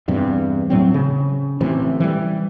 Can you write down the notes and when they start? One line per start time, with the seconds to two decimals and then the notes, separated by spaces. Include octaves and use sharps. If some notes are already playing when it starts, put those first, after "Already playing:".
0.08 E2 G2 C3
0.70 A2 F#3 C4
0.94 C#3
1.61 A1 C3 E3
2.00 E3 G3